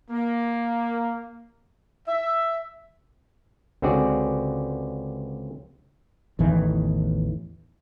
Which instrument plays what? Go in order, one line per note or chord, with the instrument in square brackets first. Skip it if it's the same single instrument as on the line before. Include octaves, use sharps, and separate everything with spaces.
[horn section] A#3
E5
[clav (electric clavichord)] C#2 D3 C4 F#4 G#4 D5
[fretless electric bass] A1 E2 D#3 E3